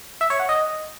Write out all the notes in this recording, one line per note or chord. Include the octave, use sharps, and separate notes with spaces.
E5
C#5
F#5
D#5